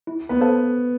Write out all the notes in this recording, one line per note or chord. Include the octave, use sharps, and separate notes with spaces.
E4
B3 B4
A4 C5 F5 A5